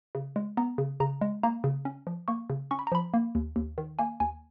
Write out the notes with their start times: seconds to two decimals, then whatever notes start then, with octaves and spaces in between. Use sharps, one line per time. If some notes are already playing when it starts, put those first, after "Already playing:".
0.15 C#3
0.36 G#3
0.57 B3 A#5
0.78 C#3
1.00 C#3 A#5
1.21 G#3
1.43 A#3 A#5
1.64 C#3
1.85 C#4
2.07 F3
2.28 A#3 C#6
2.50 C#3
2.71 C#4 C#6
2.79 B5
2.87 A#5
2.92 F3 B5
3.14 A#3
3.35 D#2
3.56 D#2
3.78 D#3
3.99 A#3 G#5
4.20 D#2 G#5